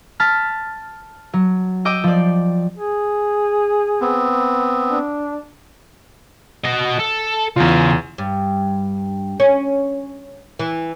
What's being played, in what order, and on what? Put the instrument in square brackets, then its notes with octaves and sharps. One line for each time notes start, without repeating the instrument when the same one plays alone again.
[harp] A5 F6 A6 B6
F#3
D#5 G5 D6 E6
F3 D5
[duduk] G#4
[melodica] B3 C4
[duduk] D4
[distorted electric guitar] F#4 D#5
A4
[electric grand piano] E2 F4 [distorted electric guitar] C#3
[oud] G2
C#4
E3